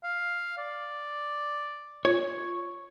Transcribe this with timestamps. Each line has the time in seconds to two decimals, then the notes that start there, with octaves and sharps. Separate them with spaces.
0.03 F5
0.58 D5
2.05 F4 C#5